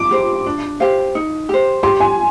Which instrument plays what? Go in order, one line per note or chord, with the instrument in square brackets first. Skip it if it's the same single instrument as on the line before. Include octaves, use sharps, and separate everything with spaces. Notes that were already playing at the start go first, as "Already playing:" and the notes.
Already playing: [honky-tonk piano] D6
[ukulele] G4 C5
D4
G4 C5 F5
D#4
G4 C5
[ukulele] G4 [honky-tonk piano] C6
[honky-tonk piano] G#5